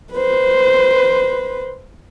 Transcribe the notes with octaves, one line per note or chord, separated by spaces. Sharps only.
B4 C5